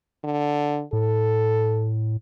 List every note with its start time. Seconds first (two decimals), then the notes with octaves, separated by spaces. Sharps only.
0.24 D3
0.93 A2 A4